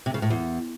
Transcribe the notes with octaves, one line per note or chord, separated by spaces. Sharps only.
C3
C#3
A2
E2